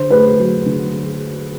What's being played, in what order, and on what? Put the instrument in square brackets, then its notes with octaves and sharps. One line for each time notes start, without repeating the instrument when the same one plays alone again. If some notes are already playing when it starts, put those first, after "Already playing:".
Already playing: [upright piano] D3 C5
A3 B4
F#3
D3